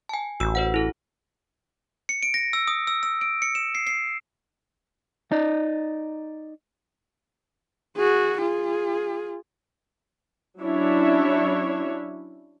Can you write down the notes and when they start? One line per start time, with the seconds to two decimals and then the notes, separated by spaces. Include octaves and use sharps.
0.09 G#5 A5
0.40 A1 F#4 E6
0.55 F#4 C5 F#5
0.74 E4 A4
2.09 C#7
2.23 D7
2.34 A#6
2.53 E6
2.67 D#6
2.87 E6
3.03 E6
3.21 D7
3.42 C#7
3.55 E7
3.75 C7
3.87 C7
5.31 D#4 D5 D#5
7.97 F#4 G#4
8.37 F4 G#4
10.62 F#3 C#4 D4 E4 C#5 E5